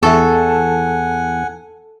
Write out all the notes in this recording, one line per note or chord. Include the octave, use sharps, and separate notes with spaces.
E2 A4 E5 F#5 G#5 C#6